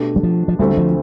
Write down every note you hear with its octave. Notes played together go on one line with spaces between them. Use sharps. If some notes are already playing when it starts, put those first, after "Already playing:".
Already playing: B2 A3 D4 G4
G3
F3
F3
D2 D3 G3 A3 C4
F3